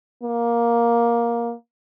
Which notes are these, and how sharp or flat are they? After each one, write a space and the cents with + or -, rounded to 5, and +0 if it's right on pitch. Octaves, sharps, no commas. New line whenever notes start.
A#3 +10